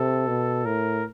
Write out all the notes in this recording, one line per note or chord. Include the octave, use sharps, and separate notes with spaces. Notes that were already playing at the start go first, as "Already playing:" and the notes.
Already playing: C3 A4
B2
A2 A#4